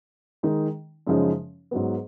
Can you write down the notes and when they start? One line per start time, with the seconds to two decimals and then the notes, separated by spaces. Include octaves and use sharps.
0.43 D#3 G#3 D#4
1.07 F#2 C#3 F3 G#3 D#4
1.71 G#2 F#3 B3